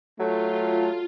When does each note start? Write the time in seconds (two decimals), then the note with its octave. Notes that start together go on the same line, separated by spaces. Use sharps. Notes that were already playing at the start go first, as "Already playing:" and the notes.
0.20 F#3 A3 F4